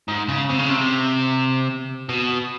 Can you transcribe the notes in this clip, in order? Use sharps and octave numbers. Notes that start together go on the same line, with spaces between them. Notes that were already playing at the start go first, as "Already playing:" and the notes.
G#2
C#3
C3
C#3
C3
B2